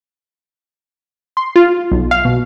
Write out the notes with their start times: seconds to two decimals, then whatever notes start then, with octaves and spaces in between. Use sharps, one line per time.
1.37 C6
1.56 F4
1.91 B1
2.11 F5
2.25 B2